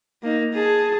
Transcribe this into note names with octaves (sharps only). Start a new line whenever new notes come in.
A#3 D#4
G#4 A5